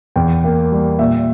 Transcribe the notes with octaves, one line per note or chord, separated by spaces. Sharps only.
E2 G5
A#3
G3
A#2 E5